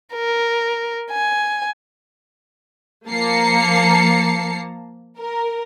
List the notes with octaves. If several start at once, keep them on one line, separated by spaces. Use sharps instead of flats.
A#4
G#5
F3 A#3 A5 A#5 C7 C#7
A#4